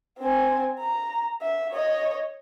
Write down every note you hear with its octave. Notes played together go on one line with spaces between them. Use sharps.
C4 G#5
A#5
E5
C#5 D#5